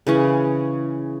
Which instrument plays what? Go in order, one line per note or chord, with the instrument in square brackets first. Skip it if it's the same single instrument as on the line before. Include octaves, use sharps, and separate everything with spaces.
[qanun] C#3 E3 C#4 F#5